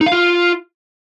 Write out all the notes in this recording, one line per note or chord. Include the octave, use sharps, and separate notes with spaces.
D#4
F5
F4